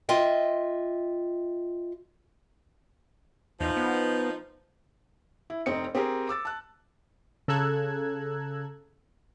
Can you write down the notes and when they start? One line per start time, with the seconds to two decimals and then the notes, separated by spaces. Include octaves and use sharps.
0.09 F4 D#5 E5 G5
3.61 E2 F3 D#4
3.77 B3
5.50 E4
5.66 F1 C4 D#4 C#7
5.95 C4 G4 G#4 A#4
6.29 D6 E6 A6
6.45 A5 F#6
7.48 C#3 A4 A#5 E6 F#6 G#6